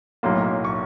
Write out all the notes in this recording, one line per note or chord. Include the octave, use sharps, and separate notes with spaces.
B1 A2 F#3 A#3 C6
C#6